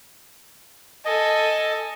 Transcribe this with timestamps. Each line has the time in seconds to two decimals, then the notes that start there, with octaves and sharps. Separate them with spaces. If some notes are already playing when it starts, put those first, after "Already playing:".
1.05 A4 D#5 G#5